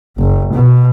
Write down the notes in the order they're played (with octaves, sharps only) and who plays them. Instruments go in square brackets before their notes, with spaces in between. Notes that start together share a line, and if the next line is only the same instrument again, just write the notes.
[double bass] F#1
B2